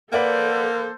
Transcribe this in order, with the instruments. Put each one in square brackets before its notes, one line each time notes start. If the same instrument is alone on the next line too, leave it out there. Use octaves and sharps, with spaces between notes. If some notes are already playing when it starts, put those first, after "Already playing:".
[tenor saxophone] A#3 [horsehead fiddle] A4 C5 [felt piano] B4 D5 F#5